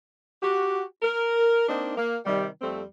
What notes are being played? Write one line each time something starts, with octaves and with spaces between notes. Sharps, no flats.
F#4 G4
A#4
A#3 C4 D4 D#4
A#3
C3 D#3 G3
F2 G3 A3 C4